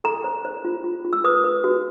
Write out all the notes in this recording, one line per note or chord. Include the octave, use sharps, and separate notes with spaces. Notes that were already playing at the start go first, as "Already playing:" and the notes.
A4 A#5
C5
C5
F4
F4
F4
E6
B4 D#6
B4
F#4